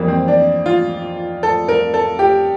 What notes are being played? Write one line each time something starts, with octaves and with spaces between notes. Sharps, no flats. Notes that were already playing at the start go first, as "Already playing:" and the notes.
Already playing: F2 E3 G3 A#3
C4
D4
F4
A4
A#4
A4
G4